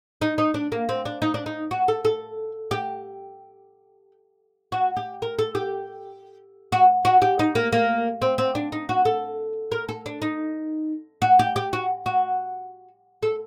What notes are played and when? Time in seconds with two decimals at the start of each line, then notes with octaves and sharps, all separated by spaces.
0.21 D#4
0.38 D#4
0.54 D4
0.72 A#3
0.89 C4
1.05 D4
1.22 D#4
1.34 D4
1.46 D#4
1.71 F#4
1.88 A4
2.05 A4
2.71 G4
4.72 F#4
4.97 G4
5.22 A#4
5.39 A4
5.55 G4
6.72 F#4
7.05 F#4
7.22 G4
7.39 D#4
7.55 A#3
7.72 A#3
8.22 C4
8.38 C4
8.55 D4
8.72 D#4
8.89 F#4
9.05 A4
9.72 A#4
9.89 A4
10.06 D4
10.22 D#4
11.22 F#4
11.39 G4
11.56 G4
11.73 F#4
12.06 F#4
13.22 A4